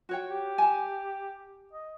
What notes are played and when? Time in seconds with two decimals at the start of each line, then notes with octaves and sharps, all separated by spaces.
0.09 F#4 C#5 G5
0.31 G4
0.58 G#5 A5
1.73 D#5